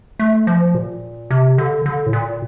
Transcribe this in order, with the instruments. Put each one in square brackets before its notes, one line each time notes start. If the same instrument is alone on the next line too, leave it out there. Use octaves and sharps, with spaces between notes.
[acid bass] A3
F3
A#2
C3
D3
D3
A2
A#2